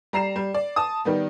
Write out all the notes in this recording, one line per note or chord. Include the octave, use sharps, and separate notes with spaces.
G3 A#5 C7 E7
G3
D5
A5 D#6
D#3 G3 B3